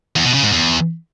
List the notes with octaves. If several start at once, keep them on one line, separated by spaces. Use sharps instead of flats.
E2
B2
C#3
G#2
E2